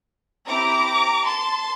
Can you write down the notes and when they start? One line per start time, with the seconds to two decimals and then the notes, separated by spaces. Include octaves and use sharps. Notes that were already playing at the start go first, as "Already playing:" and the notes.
0.47 C4 E4 G4 A#5 D6
1.25 A5 C6